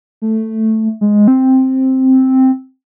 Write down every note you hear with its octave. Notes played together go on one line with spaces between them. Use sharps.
A3
G#3
C4